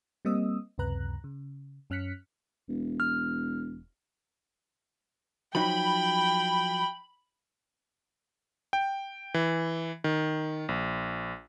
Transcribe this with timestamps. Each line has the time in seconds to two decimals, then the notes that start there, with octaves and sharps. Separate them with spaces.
0.25 G3 A#3 C4 D#5 D#6 E6
0.78 C#2 F#2 C3 B4 A#5 F#6
1.24 C#3
1.90 F#2 C#4 F6 F#6 B6 C#7
2.69 E1
3.00 F6
5.55 F3 F#3 D#4 G5 B5
8.73 G5
9.34 E3
10.04 D#3
10.69 A#1